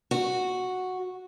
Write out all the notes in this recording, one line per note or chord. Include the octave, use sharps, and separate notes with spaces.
F#4